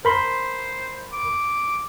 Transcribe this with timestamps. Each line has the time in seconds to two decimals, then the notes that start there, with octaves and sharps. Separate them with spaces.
0.05 A#4 C5 B5 C6
1.13 D6